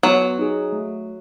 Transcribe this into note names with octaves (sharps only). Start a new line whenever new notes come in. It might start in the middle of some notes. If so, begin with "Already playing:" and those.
F#3 B3
D#4 G#4
A3